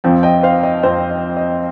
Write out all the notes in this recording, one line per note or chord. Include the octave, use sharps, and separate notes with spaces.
F2 F3 C4
D#5 G5
C5 F5
D#5
F2 F3 C4 C5
D#5
D#5